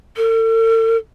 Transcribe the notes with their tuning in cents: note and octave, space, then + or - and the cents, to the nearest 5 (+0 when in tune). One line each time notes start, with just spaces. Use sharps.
A4 +45